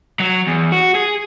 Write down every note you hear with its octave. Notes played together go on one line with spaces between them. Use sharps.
F#3
E2
F#4
G#4